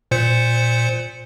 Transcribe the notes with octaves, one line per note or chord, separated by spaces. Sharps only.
A#2 C5 C#7